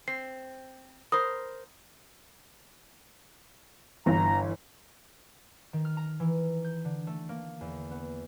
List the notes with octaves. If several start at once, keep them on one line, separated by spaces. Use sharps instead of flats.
C4 C7
A#4 C5 B5 D#6
G1 E3 A#5
D#3
F6
A#5
E3
G6
D3
A3
A#3
E2
B3